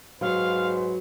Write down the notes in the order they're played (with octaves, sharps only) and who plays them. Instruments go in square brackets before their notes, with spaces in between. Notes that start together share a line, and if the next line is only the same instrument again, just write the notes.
[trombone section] G#2 B4 C5 [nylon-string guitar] F#3 [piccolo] F5